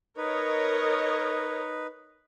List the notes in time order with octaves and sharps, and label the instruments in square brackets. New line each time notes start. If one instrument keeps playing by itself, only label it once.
[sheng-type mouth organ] D#4 B4 [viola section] A#4 C#5 D#5